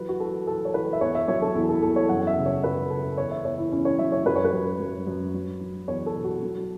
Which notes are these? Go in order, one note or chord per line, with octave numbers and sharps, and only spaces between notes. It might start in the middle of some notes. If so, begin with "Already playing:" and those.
Already playing: E3 F#3 B4
F#4
E3 A4
E3 A4
C#5
E3 B4
E5
E2 C#5
E5
F#3 C#5
A4
E2 E4
A4
E2 A4
C#5
F#2 F#5
E5
C#3
C#5
F#2 B4
C#3 A4
E2 C#5
E5
E2 C#5
E4
E2 C#4
C#5
F#3 E5
C#5
F#2 B4
C#5
B4
F#2
F#2
F#2
F#3
F#3
E2 C#5
A4
B2
F#4
F#3